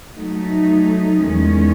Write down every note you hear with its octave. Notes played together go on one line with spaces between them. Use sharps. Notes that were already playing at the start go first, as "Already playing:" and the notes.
F#3 A3 D#4
E2 D#3 G#3 C#4